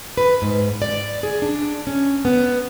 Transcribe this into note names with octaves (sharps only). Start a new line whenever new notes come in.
B4
G#2
D5
G#4
D4
C#4
B3